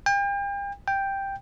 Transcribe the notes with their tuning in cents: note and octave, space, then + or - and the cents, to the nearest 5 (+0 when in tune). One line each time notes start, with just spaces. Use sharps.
G5 +40
G5 +5